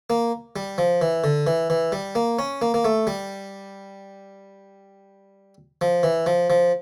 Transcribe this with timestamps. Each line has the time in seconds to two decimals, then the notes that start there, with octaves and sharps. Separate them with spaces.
0.10 A#3
0.56 G3
0.78 F3
1.02 E3
1.24 D3
1.47 E3
1.70 E3
1.92 G3
2.15 A#3
2.39 C#4
2.62 A#3
2.74 A#3
2.85 A3
3.07 G3
5.81 F3
6.03 E3
6.26 F3
6.50 F3